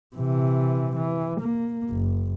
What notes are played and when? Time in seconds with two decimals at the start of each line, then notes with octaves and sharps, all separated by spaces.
0.16 C3 E3
0.96 E3
1.41 A#3
1.90 F#1